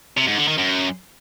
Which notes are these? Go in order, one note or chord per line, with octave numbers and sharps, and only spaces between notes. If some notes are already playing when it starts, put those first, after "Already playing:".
C3
G#2
D3
D#3
F#2